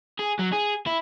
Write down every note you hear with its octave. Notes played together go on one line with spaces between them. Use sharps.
G#4
F#3
G#4
E4